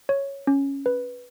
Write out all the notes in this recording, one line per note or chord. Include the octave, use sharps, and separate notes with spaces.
C#5
C#4
B4